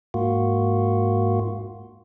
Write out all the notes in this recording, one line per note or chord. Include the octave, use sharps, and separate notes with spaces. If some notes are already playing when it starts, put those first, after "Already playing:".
G#2 A#3 F4 F#4